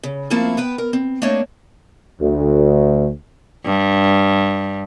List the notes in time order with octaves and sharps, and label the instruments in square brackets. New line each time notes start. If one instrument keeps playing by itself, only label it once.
[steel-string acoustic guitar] C#3
F3 A3 A#3 C4 E4 F4
B3 B4 G5
A#4
C4
A3 A#3 C4 D4 C#5 D#5
[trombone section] D2
[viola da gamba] G2